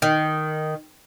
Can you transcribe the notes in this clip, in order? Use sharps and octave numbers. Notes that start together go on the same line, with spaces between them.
D#3